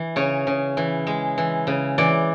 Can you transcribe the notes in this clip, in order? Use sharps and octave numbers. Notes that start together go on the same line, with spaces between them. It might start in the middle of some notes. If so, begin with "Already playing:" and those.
Already playing: E3
C#3 C#5
C#3
E3
G#3
E3
C#3
E3 D5